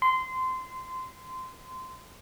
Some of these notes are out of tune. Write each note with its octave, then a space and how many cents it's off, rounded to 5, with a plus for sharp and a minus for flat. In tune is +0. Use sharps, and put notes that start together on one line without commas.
C6 -20